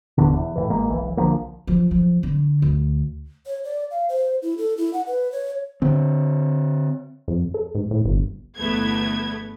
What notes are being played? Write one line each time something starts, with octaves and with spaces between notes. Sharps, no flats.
F1 D#2 B2 D3
E2
A2 C3 E3
G#1 G#3 A#3
E1 B1 E3
B1 D3 F3 A#3
F3
F3
D3
D2
C#5
D5
F5
C5
E4
A4
E4
F#5
B4
C#5
D3 C4
F2
A4
G#2
A2
G1
G1 E2 A3 B3 G#6